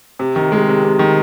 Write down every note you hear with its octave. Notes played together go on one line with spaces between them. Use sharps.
C3
D#3
G#3
C3
C3
D#3